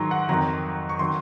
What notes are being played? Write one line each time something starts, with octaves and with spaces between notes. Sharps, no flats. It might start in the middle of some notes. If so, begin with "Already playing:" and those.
Already playing: G#2 D#3 F#3 A#5 C6
F#5
F2 D#3 F#3 A#5
C#6
D#3 F#3 C6